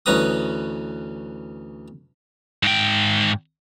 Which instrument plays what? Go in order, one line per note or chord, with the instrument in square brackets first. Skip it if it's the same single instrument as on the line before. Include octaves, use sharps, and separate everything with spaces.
[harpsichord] D2 E3 C#4 B4 A#5 D#6
[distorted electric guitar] G#2 G5